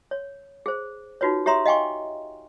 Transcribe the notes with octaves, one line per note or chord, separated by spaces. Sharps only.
C#5
G#4 C5
D#4 F4 F#4 B4 C#5
G4 C#5 E5 A#5 C6 D#6
D#5 F5 G5 G#5 C6 C#6